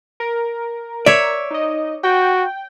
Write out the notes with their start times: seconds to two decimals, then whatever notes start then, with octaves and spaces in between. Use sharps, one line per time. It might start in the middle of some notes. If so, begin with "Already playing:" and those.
0.20 A#4
1.06 C#5 D5 E5
1.51 D#4 D#5
2.04 F#4 G5